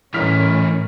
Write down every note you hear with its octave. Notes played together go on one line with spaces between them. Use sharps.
A2 E3 C#4 A#4 F6 B6